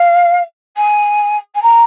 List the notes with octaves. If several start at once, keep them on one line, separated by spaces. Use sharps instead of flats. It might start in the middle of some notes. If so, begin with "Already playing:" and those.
Already playing: F5
G#5
G#5
A#5